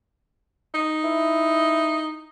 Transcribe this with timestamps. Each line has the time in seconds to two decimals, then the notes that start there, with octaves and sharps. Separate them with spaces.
0.74 D#4
1.04 E4